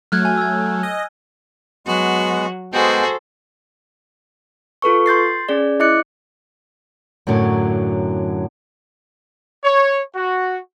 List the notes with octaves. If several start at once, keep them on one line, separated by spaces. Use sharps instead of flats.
F#3 A3 F6 F#6 G#6
G#5
E6 G#6
D#5
F#3 G#3 B3 F#4
G#3 B3 F#4 G#4 A4 C5 G5
F4 A4 B4 C#6
C6 G6 A6 C7
C#4 G#4 D5
E4 D#5 D6 F#6 C#7
F#2 A2 D3 F#3
C#5
F#4